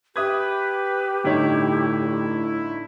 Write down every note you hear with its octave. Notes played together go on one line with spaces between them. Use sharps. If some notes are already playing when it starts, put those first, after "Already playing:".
G4 B4 E5 D#6 G#6
G1 A2 D#4 E4 C#5